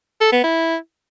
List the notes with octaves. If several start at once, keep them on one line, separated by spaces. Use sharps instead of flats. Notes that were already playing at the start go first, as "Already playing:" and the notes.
A4
B3
E4